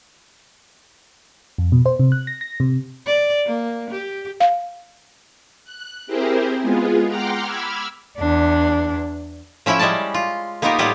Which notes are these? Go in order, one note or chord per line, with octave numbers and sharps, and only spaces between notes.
F2
B2
C5
C3
F#6
A#6
A#6
C3
D5
A#3
G4
F5
F#6
C4 E4 G4 G#4 A#4 C5
G#3 B3 F4 G#4
F#5 G5 A#5 C6 D6 F6
B5 D6 E6 F6 G#6
E2 D4
F3 C#4 E4 E5 G5
G3 G#3 C#4 D5 A5
F4
A#3 B3 D#4 F4 G4 A#4
A2 G3 B3 E4 F4 G4